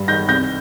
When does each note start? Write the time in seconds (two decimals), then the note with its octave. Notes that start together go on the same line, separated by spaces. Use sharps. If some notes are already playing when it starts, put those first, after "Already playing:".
Already playing: G2
0.08 D#3 G6 A#6
0.28 C2 G6 A#6